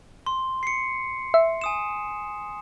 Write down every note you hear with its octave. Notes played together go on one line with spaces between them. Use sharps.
C6
C7 C#7
E5
G#5 D#6 E7